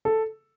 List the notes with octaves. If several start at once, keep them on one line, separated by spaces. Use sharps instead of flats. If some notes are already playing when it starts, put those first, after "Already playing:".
A4